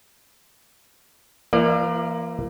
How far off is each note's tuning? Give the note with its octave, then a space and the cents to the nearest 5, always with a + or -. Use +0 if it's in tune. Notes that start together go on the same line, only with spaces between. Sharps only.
E3 +40 A#3 +0 D5 +30